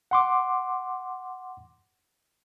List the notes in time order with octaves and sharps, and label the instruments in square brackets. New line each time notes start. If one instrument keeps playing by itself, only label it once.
[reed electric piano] F#5 C6 D6